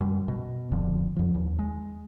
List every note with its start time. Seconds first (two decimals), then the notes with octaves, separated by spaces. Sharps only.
0.01 F#2 G3
0.28 B2
0.72 D1 F2 D3 F3
1.16 F2 F3
1.34 D#2
1.59 G#3